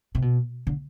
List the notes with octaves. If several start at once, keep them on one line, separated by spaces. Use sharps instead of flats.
C3
B2
D3